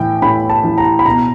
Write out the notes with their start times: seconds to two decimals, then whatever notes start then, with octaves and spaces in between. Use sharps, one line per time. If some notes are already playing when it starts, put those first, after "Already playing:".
Already playing: A2 E3 G5
0.22 A2 B5
0.50 A5
0.63 E3
0.78 A#5
0.99 B5
1.06 B2 A#5